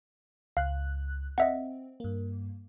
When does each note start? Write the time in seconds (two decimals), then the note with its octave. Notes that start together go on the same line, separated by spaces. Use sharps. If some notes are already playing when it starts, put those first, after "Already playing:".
0.57 C#2 F5 F#6
1.38 C4 D#5 E5 F#5
2.00 G2 A#3